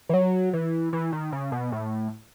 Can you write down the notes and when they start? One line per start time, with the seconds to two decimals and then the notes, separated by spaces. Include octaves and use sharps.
0.09 E3
0.14 F#3
0.53 E3
0.93 E3
1.12 D#3
1.32 C#3
1.52 B2
1.72 A2